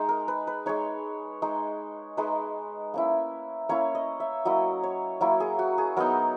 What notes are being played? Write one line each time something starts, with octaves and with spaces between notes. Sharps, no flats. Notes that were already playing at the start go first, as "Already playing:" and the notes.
Already playing: G#3 D#4
A#4
B4
B4
G#3 D#4 C#5
G#3 D#4
G#3 D#4 B4
A#3 C#4 E4
A#3 C#4 E4 C#5
D#5
E5
F#3 A#3 E4 D#5
C#5
F#3 A#3 E4 A#4
G#4
F#4
G#4
F#3 B3 D#4 A#4